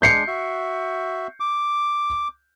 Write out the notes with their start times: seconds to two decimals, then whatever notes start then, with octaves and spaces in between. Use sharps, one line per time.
0.02 G#3 D4 G6 C7 C#7
0.27 F#4 E5
1.40 D6